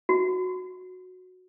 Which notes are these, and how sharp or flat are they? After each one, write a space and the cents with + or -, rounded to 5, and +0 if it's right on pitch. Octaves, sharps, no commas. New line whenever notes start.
F#4 -10